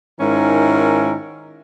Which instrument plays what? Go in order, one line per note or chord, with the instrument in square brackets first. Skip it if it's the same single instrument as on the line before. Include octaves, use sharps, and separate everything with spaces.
[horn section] G#2 D#3 C#4 E4 A#4